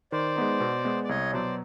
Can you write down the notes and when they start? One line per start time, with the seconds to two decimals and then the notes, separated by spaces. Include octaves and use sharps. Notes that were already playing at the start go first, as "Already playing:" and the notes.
0.12 D#3 C5 D5
0.36 G#3 B3 D#4
0.60 B2
0.85 G#3 B3
1.04 D5
1.09 C2 C#5 D#5
1.33 B2 F#3 B3 C5 D5